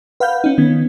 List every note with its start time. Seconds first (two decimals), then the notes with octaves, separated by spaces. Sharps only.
0.20 B4 F5 F#5 B5 F6 G6
0.44 C#4 D#4
0.58 D#3 B3 C#4 G#6